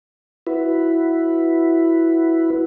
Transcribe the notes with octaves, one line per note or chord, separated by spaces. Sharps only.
E4 F#4 B4